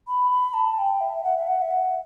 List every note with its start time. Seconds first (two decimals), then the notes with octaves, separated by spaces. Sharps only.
0.07 B5
0.31 B5
0.54 A5
0.78 G5
1.01 E5
1.24 F#5
1.37 E5
1.47 F#5
1.62 E5
1.71 F#5